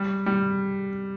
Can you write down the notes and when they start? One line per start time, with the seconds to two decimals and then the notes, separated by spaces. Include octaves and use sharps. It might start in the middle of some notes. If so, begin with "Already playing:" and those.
Already playing: G3
0.26 G3